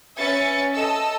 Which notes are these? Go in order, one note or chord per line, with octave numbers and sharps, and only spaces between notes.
C#4 B4 E5 A6 C#7
A4 D#5 E6